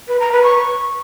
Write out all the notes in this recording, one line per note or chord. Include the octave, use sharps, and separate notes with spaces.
B4
A#5
B4
C#6